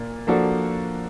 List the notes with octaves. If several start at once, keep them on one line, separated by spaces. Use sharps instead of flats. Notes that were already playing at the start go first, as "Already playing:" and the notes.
Already playing: A#2 A#3
F3 A#3 D4 F#4 A4